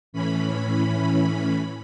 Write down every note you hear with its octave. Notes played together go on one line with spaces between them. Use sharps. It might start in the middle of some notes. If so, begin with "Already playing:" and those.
A2 E3 C#4 B5